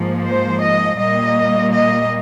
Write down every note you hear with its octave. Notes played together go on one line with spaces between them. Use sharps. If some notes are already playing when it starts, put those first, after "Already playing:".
Already playing: G#2 F3 A#3
C5
D#5
A#2 G3 A#3 D#5
D#5